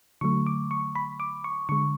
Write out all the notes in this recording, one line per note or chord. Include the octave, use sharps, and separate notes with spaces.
D3 F#3 A3 C#6
D6
C#6
B5
D6
C#6
D3 G#3 C#6